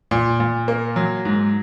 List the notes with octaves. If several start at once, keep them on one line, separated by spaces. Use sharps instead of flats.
A#2
A#2
A#3
F#3
G#2